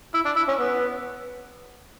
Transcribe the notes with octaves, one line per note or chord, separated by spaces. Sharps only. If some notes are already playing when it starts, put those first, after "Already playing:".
E4
D4
E4
C#4
B3